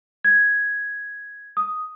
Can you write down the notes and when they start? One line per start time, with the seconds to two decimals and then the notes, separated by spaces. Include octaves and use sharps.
0.24 G#6
1.57 D#6